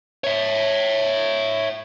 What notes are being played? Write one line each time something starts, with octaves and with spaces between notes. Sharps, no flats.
C#5 E5